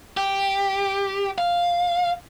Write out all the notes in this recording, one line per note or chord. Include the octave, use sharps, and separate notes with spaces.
G4
F5